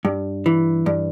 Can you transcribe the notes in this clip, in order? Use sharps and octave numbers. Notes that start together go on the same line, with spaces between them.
G2
E3
G2